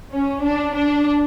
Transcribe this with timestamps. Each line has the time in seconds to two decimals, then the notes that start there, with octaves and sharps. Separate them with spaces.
0.11 C#4
0.43 D4
0.74 D4